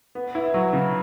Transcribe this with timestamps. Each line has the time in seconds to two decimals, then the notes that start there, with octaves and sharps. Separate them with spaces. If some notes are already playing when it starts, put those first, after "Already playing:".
0.15 B3
0.35 E4
0.54 F#3
0.73 C#3